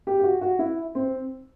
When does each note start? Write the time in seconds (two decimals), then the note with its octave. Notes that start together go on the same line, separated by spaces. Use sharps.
0.07 G4
0.19 G4
0.24 F#4
0.41 F#4
0.59 E4
0.95 C4